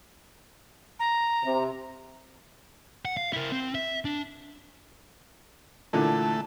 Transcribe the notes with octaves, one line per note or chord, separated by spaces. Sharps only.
A#5
C3
F#5
F5
E4 A#4
C4
E5
D4
A#2 D3 E3 A3